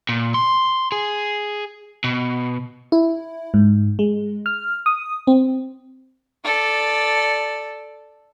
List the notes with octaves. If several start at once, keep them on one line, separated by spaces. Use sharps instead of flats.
A#2
C6
G#4
B2
E4
G#2
G#3
F6
D#6
C4
A4 D5